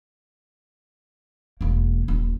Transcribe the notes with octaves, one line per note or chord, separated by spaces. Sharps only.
E1 A#3
D#1